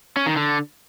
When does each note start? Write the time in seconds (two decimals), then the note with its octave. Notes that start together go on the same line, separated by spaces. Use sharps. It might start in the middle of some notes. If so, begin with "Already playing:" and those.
0.16 C#4
0.26 D#3
0.36 D3